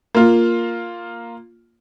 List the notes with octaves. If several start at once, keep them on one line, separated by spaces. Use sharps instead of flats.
A#3 F4